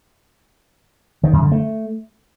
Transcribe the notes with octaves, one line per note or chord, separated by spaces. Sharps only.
D#3
F#2
D3
A3